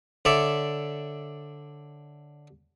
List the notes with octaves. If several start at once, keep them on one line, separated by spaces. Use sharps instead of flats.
D3 C#5 D5 E5